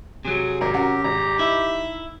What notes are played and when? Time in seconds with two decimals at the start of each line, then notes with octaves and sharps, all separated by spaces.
0.25 C3 F#3 G#4
0.61 G#1 G4 A#4
0.74 C#4 F#4 A#4
1.04 G#1 A#5
1.39 D#4 E4 E5